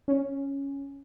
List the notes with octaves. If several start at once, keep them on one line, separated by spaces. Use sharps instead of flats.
C#4